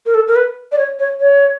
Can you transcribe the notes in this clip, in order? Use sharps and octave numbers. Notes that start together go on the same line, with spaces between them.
A#4
A4
A#4
B4
D5
C#5
C#5
C#5